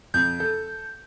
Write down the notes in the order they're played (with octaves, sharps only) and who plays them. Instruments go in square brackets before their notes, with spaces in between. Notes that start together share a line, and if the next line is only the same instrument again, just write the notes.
[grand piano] F2 [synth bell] G6
[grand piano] A4